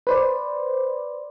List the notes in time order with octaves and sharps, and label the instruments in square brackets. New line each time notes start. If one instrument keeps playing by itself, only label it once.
[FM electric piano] B4 C5 D5